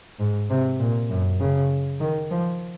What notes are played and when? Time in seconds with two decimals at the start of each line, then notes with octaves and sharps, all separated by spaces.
0.20 G#2
0.50 C3
0.80 A#2
1.10 F#2
1.40 C#3
2.01 D#3
2.31 F3